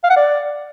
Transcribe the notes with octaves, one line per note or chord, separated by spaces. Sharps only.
F5
F#5
D5